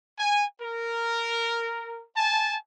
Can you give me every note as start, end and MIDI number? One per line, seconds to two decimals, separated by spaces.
0.18 0.44 80
0.61 2.04 70
2.16 2.55 80
2.16 2.55 81